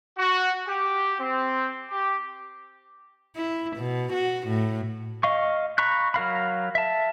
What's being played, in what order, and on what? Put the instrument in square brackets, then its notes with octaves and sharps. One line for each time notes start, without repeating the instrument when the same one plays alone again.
[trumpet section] F#4
G4
C4
G4
[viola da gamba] E4
B2
F#4
A2
[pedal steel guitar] D#5 F5 C#6
A#5 B5 C#6 F#6
F#3 A#4 F5 B5
E5 A5